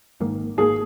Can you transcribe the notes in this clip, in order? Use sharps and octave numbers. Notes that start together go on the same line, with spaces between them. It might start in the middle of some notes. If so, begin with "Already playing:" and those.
G#1 G#2 D#3 A#3
G#1 G#2 D#3 A#3 G#4